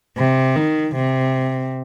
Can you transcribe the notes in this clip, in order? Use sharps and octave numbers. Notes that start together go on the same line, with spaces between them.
C3
D#3
C3